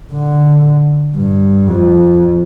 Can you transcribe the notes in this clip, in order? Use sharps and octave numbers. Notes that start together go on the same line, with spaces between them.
D3
G2
F2